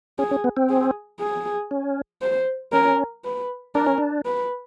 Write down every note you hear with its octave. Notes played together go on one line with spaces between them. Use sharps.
C#4 G#4
C#4
B3
C4
G#4
G#4
C#4
C5
C#4 A#4
B4
D4 A#4
C#4
D4
B4